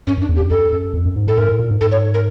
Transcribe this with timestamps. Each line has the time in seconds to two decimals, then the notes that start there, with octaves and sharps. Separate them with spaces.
0.07 G2 C#4
0.18 F#2 D4
0.29 E2
0.36 G4
0.40 F2
0.50 F#2 A4
0.72 F#2
0.94 F2
1.05 F#2
1.16 G#2
1.27 A2 A4
1.38 G#2 A#4
1.49 A2
1.60 A#2
1.71 G#2
1.81 G#2 A4
1.92 C#5
2.14 A#4